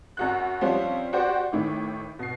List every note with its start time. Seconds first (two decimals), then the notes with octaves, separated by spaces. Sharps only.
0.17 F#2 F#4 F#6
0.61 F3 G3 C4 C#4
1.13 F#4 G4 C5 D5
1.52 A1 A2 D#3 E4
2.19 B2 C7